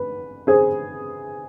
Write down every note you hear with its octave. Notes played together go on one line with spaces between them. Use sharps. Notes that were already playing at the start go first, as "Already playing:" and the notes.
Already playing: B4
G#4 C5